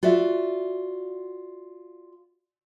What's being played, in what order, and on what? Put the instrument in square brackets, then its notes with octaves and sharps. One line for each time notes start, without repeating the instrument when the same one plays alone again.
[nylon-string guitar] F4 F#4 D5 E5